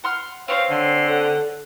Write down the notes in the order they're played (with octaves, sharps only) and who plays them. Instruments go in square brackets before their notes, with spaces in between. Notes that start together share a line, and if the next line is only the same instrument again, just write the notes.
[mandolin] F#5 C6 F6
[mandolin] C4 C#4 C5 [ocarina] C#5 [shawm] F5
[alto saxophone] D3 [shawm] C6
[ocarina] A4 [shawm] F#5